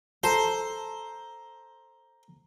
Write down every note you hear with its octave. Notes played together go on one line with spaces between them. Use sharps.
A4 C5 A#5